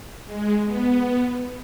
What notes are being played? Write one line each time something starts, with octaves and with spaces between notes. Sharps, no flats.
G#3
B3